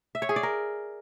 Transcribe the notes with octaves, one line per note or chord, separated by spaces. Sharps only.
E5
C#5
G#4
D5
A#4